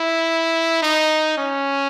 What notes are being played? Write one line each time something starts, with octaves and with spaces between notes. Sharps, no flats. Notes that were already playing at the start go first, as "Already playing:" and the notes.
Already playing: E4
D#4
C#4